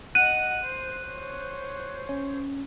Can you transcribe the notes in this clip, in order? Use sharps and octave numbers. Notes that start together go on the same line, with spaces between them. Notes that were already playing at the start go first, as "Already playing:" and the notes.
D#5 F#5 F#6 D#7
C5
C5 C#5
C#4